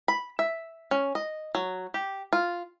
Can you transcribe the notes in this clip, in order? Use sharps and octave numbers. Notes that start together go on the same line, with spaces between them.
B5
E5
C#4
D#5
F#3
G4
F4